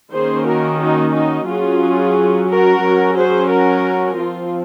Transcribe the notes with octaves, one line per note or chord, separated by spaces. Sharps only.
D#3 A#3 C#4 G#4 C5
F#4 A#4
D#4 F#4
D#4 F#4
F#3 C#4 F4 G#4
F#4 A#4
F#3 C#4
G#4 C5
F#4 A#4
F3 C4 F4